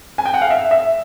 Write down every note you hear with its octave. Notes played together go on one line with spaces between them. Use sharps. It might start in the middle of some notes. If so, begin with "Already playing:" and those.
G#5
G5
F#5
F5
E5
E5